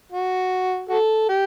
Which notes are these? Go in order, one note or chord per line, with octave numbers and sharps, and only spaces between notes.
F#4
F#4 A4
G4